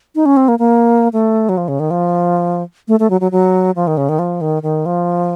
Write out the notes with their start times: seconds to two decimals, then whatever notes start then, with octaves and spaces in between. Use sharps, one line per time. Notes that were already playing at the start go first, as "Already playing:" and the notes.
0.15 D#4
0.26 C#4
0.37 C4
0.48 A#3
0.59 A#3
1.13 A3
1.49 F#3
1.57 F3
1.68 C#3
1.80 D#3
1.91 F3
2.88 A3
3.00 A3
3.10 F#3
3.21 F#3
3.32 F#3
3.76 F3
3.87 D#3
3.97 C#3
4.09 D#3
4.19 F3
4.41 D#3
4.63 D#3
4.86 F3